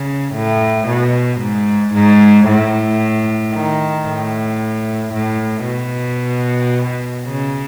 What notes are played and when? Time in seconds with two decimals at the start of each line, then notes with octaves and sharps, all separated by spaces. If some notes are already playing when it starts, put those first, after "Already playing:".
Already playing: C#3
0.35 A2
0.88 B2
1.41 G#2
1.94 G#2
2.48 A2
3.54 D#3
4.07 A2
5.14 A2
5.66 B2
7.26 C#3